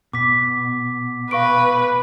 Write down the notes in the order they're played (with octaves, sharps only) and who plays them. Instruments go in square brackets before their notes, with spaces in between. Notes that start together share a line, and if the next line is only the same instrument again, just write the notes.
[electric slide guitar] B2 [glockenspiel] D6 B6
[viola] B4 [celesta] F5 C#6 D7